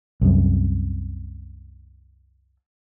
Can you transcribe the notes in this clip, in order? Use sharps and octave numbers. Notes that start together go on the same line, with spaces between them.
C2 F#2